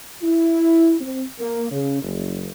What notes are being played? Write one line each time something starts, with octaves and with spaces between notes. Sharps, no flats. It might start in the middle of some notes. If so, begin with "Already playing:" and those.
E4
C4
A#3
C#3
F#1